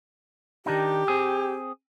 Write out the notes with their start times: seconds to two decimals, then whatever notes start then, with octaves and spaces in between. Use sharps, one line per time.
0.66 D#3 D4 D#4 G4
1.08 C4 G#4